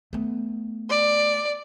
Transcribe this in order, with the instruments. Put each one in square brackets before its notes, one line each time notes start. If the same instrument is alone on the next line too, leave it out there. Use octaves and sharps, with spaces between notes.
[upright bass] A3 B3
[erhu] D5